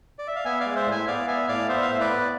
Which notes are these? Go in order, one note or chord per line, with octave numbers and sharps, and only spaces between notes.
D5
E5
F5
B3 E5 G#5
D5 F5
G#3
C5 E5
A2
E5 G#5
B3 D5 F5
B3 E5 G#5
A2 D5 F5
B3 C5 E5
F5
A2 E5
B4 D5
B3